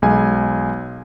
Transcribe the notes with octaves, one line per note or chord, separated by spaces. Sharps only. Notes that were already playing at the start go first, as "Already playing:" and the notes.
B1 G#3 G#5